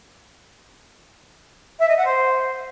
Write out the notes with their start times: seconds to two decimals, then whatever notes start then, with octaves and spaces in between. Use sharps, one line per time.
1.80 E5
1.89 D#5
1.97 F#5
2.05 C5